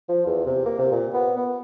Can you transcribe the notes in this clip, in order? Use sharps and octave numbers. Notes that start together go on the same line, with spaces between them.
F3
E2
C3
A#3
C3
A#2
B3
B3